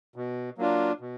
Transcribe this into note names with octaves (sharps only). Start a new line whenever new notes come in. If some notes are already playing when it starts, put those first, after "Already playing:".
B2
F#3 A#3 D4 F4
B2